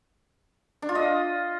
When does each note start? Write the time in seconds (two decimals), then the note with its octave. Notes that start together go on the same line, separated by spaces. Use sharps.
0.82 D4
0.89 F4
0.95 D#5